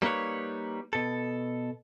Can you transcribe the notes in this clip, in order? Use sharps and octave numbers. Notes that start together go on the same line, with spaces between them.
G3 A#3 D#4 B4 C#5
B2 A4